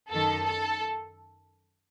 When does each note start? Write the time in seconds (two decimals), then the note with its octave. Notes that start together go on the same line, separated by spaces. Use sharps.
0.10 F#2 D#3 A4
0.46 A4